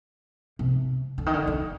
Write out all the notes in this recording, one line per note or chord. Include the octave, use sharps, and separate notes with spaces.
C3
D3
D#3
D3
D3